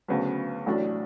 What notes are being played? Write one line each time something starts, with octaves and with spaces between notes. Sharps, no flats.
D2 C#3 F#3 B3
A1 A2 F#3 A3 D4